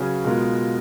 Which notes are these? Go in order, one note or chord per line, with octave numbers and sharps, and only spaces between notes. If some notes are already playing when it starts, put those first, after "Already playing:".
Already playing: C#3 F#3 C#4 G#4 B4
B2 G#3 B3 F4 A#4